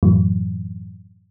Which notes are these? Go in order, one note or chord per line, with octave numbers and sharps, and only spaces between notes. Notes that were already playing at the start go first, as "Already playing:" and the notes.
F#2 A2 E3 F#3